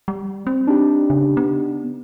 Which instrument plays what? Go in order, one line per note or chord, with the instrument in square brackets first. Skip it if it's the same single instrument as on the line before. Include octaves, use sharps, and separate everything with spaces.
[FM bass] G3
C4
[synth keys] D4 D#4 G4
[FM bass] C#3
B3